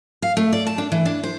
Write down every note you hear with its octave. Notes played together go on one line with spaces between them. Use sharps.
F5
A3
D5
A5
D4
E3
D4
C5